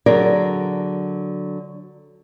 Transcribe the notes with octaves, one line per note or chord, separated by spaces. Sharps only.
D3 F#3 G#4 A#4 D5